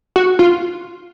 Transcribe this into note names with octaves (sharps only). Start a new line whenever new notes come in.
F#4
F4